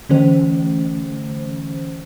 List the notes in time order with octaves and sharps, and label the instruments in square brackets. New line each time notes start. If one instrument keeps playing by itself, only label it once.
[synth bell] D3 E3 A3 C#4 C5